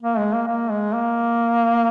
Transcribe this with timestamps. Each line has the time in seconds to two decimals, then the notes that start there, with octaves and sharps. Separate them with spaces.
0.03 A#3
0.18 G#3
0.34 A#3
0.48 A#3
0.71 G#3
0.93 A#3